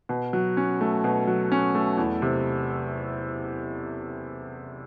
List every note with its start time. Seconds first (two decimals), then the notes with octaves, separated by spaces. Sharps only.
0.09 B2
0.33 F#3
0.57 C#4
0.81 A3
1.04 B2
1.27 F#3
1.52 C#4
1.75 A3
1.98 E2
2.22 C3